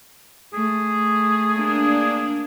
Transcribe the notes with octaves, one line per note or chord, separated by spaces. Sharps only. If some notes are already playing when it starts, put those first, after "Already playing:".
A3 G#4
A#3 D4